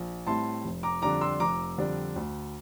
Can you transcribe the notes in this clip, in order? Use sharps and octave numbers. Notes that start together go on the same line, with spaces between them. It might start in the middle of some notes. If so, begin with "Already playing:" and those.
Already playing: A#1
A2 G3 C4 E4 A5 C6
F1
A#5 D6
F2 D3 G3 D4 A#5 D6
C6 E6
F1 A#5 D6
F2 D3 G3 D4
D2